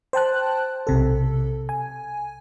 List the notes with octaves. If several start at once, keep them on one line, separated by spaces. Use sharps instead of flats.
C5 G5 A5 F#6
B1 C3 A4
G#5